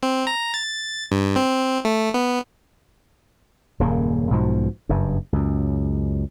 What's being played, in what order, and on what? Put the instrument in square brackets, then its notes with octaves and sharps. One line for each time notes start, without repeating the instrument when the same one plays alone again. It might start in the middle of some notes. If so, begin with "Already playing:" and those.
[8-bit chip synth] C4
A#5
A6
G2
C4
A3
B3
[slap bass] D#1 F#2 C#3 A#3
B1 G#2 B2 F3
F#1 G2
C#2 F#2